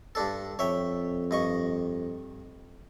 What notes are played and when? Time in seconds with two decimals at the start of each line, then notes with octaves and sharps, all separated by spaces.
0.15 G2 D4 A4
0.59 F2 C#5 E5 G5
1.31 G2 D#5 C#6